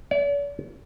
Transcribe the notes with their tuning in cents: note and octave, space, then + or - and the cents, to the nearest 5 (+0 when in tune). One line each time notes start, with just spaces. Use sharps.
D5 -45